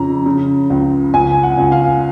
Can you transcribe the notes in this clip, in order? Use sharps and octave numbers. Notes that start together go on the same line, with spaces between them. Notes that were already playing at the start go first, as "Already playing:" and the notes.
Already playing: F2 C#3 A#5
C#3
C#2
C#2 G#5
F#5
C#2
F5